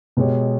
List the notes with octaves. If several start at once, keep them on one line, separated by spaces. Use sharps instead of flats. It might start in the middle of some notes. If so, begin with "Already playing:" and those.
B2 G#3 B3 G4 C#5